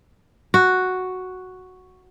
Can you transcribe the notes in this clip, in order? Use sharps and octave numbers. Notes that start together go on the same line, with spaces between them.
F#4